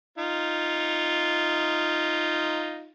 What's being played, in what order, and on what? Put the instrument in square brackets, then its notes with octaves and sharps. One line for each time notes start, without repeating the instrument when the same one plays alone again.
[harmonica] D#4 F4